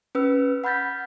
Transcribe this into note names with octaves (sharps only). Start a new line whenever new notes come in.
C#4 B4 E6
F#5 B5 F6 G6 A6 B6